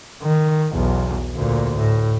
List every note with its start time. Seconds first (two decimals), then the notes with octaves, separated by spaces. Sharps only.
0.22 D#3
0.74 B1 E2
1.35 D2 A#2
1.76 A2